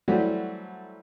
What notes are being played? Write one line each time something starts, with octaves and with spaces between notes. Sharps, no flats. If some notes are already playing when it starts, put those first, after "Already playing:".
E3 F#3 G3 A3 C4 F#4